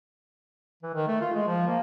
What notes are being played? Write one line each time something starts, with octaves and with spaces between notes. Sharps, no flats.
E3
D#3
A3
F4
G#3
F3
A#3